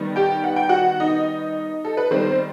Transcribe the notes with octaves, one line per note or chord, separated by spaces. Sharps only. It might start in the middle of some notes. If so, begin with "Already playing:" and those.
Already playing: D#3 G3 B3
G4 G5
F#5
G5
F#4 F#5
D#4 D#5
A4
B4
D#3 G3 B3 C4 C5